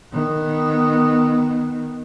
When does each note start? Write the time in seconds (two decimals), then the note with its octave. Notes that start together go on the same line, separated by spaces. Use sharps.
0.12 D#3 B3